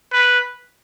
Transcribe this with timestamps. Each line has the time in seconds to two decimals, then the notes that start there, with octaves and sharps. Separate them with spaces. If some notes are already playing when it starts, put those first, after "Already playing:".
0.13 B4